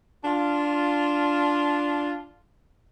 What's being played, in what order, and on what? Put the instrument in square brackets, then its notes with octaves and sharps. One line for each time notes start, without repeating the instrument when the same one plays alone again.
[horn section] D4 F4